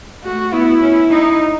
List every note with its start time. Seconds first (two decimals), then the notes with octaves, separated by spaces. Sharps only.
0.24 A3 F#4
0.52 B3 E4
0.82 C#4
1.11 D#4